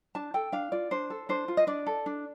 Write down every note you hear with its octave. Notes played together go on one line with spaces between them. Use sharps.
D4 A5
A4 G5
D4 F5
F4 D5
D4 C5
A4
D4 C5
F4
D#5
D4 D5
A4
D4